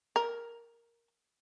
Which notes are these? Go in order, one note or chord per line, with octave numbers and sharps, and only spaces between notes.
A#4